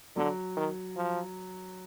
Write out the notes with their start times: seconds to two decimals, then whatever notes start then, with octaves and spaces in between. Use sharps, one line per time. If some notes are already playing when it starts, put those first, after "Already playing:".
0.16 D3 F#3
0.56 D#3
0.96 F3